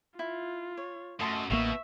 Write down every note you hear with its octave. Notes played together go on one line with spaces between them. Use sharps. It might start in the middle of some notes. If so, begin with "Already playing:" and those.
E4 F4
C#5
F#2 A3 D#5 A5 C6
A1 B2 A#3 E5 C#6